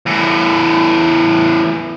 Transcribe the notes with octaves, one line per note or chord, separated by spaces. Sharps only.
E2 A2